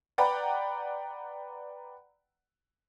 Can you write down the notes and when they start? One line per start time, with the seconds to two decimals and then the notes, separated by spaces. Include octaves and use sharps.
0.18 B4 D5 F#5 G5 A#5 B5